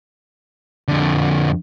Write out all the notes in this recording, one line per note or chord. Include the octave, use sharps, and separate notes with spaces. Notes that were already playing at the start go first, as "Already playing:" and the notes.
F2 D3